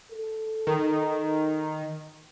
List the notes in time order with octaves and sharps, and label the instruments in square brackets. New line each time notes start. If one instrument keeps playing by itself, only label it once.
[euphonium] A4
[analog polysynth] D#3